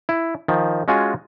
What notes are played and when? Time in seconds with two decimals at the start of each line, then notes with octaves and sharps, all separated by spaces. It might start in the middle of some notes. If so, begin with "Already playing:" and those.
0.09 E4
0.48 D#3 F3
0.88 G#3 C#4 F4 F#4 G#5